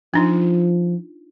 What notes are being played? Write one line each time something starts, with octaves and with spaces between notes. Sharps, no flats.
F3 D4 D#4 F4